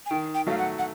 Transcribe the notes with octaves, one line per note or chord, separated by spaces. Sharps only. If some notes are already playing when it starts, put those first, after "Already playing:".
G#5
D#3 G5
G5
F#3 A3 F5
F#5
F#5